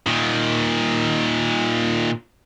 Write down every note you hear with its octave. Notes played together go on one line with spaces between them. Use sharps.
A#2 D#3